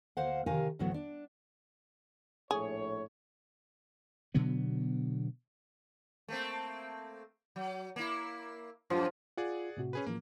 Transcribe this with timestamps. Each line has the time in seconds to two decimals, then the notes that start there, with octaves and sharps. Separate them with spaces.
0.17 D2 A#3 C5 F5 F#5
0.46 C3 D#3 G4 A#4 F5 G#5
0.79 D2 A2 E3 F#3 B3 F#4
0.94 D4
2.51 A#1 A2 G#4 C#5
4.34 B2 D3 F#3 B3
6.28 A3 A#3 C4
7.56 F#3
7.96 A#3 E4
8.90 F#2 A2 F3
9.38 F4 G#4 D5 F#5
9.77 A2 C3 F#4
9.93 C#4 G#4 B4
10.06 A2 E3 F3 A#3